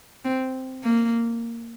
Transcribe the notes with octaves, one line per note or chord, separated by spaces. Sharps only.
C4
A#3